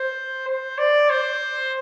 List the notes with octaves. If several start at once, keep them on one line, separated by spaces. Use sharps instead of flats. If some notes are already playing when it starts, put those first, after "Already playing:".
Already playing: C5
C5
D5
C5